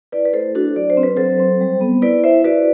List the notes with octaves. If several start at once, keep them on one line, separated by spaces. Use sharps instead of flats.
E4 B4 D5
B4
A3 A4 C5
D4 F#4 A4
F#3 D5
C5
C4
B4
F#3 A4 C5
C4
G3
B3
E4 B4 D5
E4 C5 E5
F#4 B4 D5